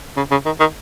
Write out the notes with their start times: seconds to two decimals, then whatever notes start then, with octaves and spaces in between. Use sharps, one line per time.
0.17 C#3
0.31 C#3
0.46 D#3
0.60 D#3